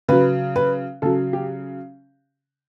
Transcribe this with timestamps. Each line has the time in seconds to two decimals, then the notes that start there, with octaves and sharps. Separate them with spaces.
0.08 C#3 F#3 B4
0.56 B4
1.02 C#3 F#3 A4
1.33 G4